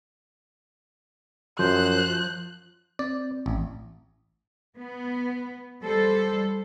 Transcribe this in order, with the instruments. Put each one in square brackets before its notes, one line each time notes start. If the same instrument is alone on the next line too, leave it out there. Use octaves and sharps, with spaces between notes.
[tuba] F#2 [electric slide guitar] F3 [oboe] C5 [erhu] F#6
[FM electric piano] C4 [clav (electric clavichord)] D5
[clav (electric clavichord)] A1
[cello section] B3
G3 A4 C5